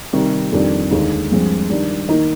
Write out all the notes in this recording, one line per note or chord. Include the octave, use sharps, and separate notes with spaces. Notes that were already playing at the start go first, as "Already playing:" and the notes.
C3 D#3 G3
F2 D#3 G3 D4
D#2 D3 G#3 D#4
G2 F3 G#3 C4
D#3 G3 D4
D#3 A#3 D#4 A#4 D#5